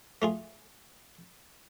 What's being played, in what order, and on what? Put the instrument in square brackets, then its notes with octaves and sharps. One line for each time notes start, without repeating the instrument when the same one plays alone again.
[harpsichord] A3 F4 G#4